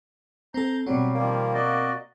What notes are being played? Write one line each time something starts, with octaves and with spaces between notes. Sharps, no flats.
C4 A4 A#5 G6
B2 F#3 G3 C4
D#3 F3 G3 A#3
F#4 D5 D#5